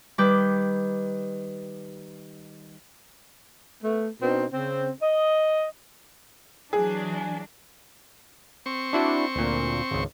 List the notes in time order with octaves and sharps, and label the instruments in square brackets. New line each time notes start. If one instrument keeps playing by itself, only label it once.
[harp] D#3 G3 B4 D6 G6
[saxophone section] A3 B3
B2 C4 D4 D#4
C#3 C4
D#5
[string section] E3 F#3 D4 [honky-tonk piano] G#4
[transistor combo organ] C4 C#6
[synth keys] D4 E4 F#4
D2 A#2
G#1 C#2